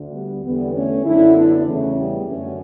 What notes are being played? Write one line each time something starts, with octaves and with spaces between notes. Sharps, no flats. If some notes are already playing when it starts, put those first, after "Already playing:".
Already playing: D2 D3
G3 B3
E2 D3 G3 B3
A3 C#4
F#2 D3 C#4 E4
B3 D4
E2 C#3 E3 A3 C#4
G3 B3
F#2 D3 A3 C#4